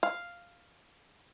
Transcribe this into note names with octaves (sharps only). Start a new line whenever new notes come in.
F5